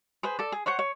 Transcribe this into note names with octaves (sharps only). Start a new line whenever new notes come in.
G#4 B4 C5
A4 D5
G#4
C5 C#5 F#5 C#6
C#5